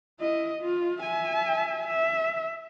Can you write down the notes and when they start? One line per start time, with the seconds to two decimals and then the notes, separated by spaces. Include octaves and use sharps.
0.20 E4 D#5
0.62 F4
1.00 E5 G#5
1.87 E5